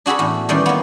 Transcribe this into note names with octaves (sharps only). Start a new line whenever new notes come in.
D4 F#4 G#4 A4 B5
E2 A2
D#3 E3 G3 C#4 D5 C6
A#3 B3